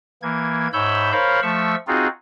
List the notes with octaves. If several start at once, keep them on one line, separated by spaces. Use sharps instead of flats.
E3 A#3 G#6
G#2 C#5 E5 B5 E6 G6
A#4 C5 C#5 F5 B5
F3 A3 E5 C#6 E6
C4 D#4 F4 F#4 G#4